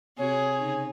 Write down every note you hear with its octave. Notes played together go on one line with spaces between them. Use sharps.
C3 C4 F#4 G#4 C#5
C#3 D#4